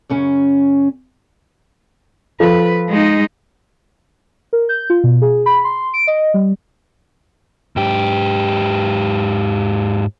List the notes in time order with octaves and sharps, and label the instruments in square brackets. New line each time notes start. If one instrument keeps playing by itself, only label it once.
[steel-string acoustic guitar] F#2 C#3 C#4
[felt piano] F3 A4 [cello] B4
[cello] G#3 D#4
[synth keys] A#4
G6
F4
B2
G#4
B5
C6
D7
D#5
G3
[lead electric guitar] G#2 G4